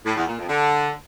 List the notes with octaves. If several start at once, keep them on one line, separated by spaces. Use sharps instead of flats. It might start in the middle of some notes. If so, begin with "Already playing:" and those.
A2
E2
A#2
F2
D3